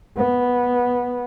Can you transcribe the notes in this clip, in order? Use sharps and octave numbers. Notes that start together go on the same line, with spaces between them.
B3